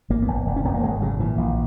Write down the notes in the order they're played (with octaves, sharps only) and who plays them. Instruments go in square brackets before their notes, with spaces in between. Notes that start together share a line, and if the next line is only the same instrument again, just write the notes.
[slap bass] G#1 A#3
B3
G#1
E1
C#4
E1 B3
A#3
G#1 G#3
C#3 F#3
A#2 E3
A#1